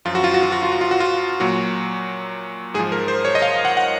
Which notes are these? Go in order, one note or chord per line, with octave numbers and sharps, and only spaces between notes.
F#2 F3 F4
F#4
F4
F#4
F4
F#4
F4
F#4
F4
F#4
F4
A#2 F#3 F#4
G#2 G#4
F3
A#4
C5
C#5
D#5
F5
F#5
F#5